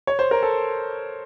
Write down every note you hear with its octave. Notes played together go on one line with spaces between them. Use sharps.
C#5
C5
A#4
A4